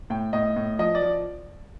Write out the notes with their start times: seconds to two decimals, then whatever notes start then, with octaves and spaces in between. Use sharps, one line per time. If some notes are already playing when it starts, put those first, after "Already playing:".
0.10 A2 G5
0.33 A2 D#5
0.56 A2
0.79 F3 D#5
0.95 D5
1.02 F3